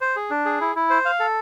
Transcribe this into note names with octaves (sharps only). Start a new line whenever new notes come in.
C5
G#4
D4
G#4
E4
E4
C5
F5
A4